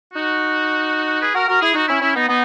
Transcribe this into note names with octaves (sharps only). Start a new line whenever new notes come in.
D#4 F#4
G#4 B4
F#4 A#4
F#4 A#4
E4 G#4
D#4 F#4
C#4 E4
C#4 E4
B3 D#4
B3 D#4